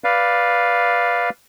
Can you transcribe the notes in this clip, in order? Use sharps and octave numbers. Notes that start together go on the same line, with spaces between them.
B4 D5 F5